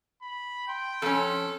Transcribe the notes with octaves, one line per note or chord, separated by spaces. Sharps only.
B5
G5 C6
F2 C#4 A4